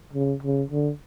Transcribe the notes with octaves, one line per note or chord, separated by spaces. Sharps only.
C#3
C#3
D3